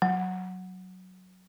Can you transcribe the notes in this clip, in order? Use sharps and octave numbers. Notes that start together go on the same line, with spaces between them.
F#3